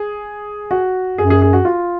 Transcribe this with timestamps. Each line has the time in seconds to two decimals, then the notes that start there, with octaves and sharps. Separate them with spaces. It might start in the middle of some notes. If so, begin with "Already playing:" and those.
Already playing: G#4
0.71 F#4
1.18 F#2 G#4
1.30 G#4
1.42 G#4
1.53 F#4
1.65 F4